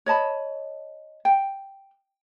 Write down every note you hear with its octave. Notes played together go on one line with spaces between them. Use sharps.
C#5 D#5 A5 B5
G5